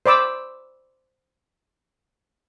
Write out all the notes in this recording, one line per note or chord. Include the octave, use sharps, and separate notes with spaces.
C5 D5 B5 D6 E6